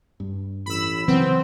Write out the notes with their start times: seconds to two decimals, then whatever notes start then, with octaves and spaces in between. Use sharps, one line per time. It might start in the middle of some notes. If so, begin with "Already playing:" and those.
0.20 G2
0.66 A1 B5 E6
1.08 C#3 E3 F#3 B3 C4